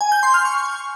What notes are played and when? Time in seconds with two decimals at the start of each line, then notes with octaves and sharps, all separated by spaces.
0.01 G#5
0.12 G6
0.23 C6
0.34 F6
0.45 C#6